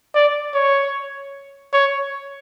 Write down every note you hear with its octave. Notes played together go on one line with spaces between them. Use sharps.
D5
C#5
C#5